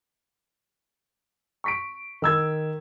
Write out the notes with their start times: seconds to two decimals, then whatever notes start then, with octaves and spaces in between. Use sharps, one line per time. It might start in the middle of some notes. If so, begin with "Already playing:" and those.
1.64 C#6 B6 D7
2.22 D#3 E6 G#6